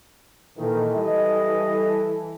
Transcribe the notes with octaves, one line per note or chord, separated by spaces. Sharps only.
A#2 D#3 E3 A4
G3 D#5